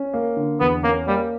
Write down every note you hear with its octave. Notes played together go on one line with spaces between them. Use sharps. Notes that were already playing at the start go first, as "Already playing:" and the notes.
Already playing: C#4
A#3
D3
E2 B3
A#3 C#4
G3 A#3